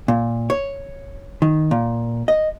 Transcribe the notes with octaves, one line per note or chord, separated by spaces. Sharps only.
A#2
C#5
D#3
A#2
D#5